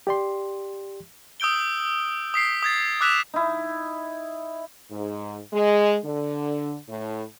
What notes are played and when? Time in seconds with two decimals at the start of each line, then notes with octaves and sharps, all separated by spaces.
0.07 G4 D5 C6
1.40 D#6 E6 G6 D7 G7
2.34 D#6 B6 C7 D7
2.62 D#6 G#6 A6
3.01 D6 E6 F#6 B6 E7 F7
3.34 D#4 E4
4.90 G#2
5.53 G#3
6.05 D3
6.88 A2